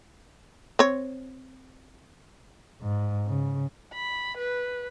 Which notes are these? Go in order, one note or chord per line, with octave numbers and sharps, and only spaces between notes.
C4 C#5
G#2
C#3
B5
B4